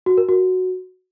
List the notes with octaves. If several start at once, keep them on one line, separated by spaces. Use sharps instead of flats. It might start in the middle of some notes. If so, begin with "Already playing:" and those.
F#4
A#4
F#4